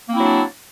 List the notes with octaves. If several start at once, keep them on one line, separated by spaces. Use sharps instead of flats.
F#3 A#3 C4 D4 E4